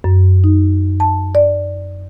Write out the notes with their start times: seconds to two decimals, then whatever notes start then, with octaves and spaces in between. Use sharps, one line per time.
0.04 F#2
0.44 D#4
1.00 A5
1.35 D5